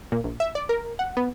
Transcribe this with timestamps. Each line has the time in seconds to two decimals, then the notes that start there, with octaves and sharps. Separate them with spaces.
0.12 A#2
0.24 A#1
0.40 E5
0.55 D5
0.69 A#4
0.99 F#5
1.17 B3